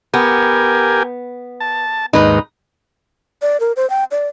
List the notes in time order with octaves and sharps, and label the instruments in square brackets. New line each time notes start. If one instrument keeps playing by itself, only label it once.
[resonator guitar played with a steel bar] B3 [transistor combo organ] G4 A#4 G#5
[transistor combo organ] A5
[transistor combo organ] D#2 G#2 [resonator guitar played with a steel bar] D#4 B4
[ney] D5
A#4
C5
G5
D5